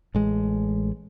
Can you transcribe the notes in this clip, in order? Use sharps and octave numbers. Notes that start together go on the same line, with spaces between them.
A1 G#3